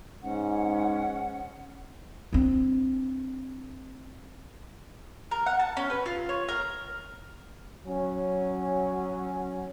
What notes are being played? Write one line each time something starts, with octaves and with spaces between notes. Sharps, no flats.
G#2 C#4 F#5
C4 D4
A#4
F#5
A5
C#4
B4
F4
C#5
A#4
F#3 C#4